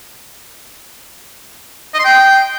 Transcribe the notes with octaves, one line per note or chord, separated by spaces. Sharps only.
D#5
C6
G5